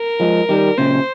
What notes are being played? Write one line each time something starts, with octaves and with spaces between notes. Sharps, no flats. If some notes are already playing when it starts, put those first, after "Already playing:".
Already playing: A#4
F3 G#3
D#3 G3
A#2 C#3 C5